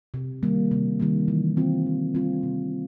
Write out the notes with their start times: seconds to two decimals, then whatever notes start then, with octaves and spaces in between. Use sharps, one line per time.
0.14 C3
0.43 D#3 G3 A#3
0.71 C3
1.00 D#3 G3 A#3
1.28 E3
1.56 G3 C4 F4
1.86 E3
2.15 G3 C4 F4
2.43 C3